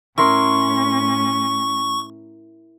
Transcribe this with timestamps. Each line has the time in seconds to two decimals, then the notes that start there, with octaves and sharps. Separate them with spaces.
0.18 A2 C#4 E4 A#4 C6 C#6